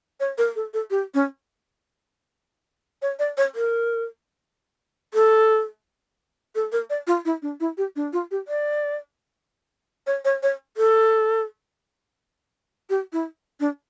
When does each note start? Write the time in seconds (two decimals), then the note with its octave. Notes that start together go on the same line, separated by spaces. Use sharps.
0.20 C#5
0.38 A#4
0.56 A4
0.74 A4
0.90 G4
1.14 C#4
3.02 C#5
3.19 D5
3.37 C#5
3.55 A#4
5.14 A4
6.55 A4
6.72 A#4
6.90 D5
7.07 F4
7.25 E4
7.42 D4
7.60 E4
7.77 G4
7.96 D4
8.13 F4
8.31 G4
8.48 D5
10.07 C#5
10.25 C#5
10.43 C#5
10.77 A4
12.90 G4
13.13 E4
13.60 D4